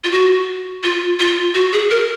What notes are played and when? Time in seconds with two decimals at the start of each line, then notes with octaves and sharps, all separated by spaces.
0.04 F4
0.12 F#4
0.83 F4
1.20 F4
1.55 F#4
1.73 G#4
1.91 A#4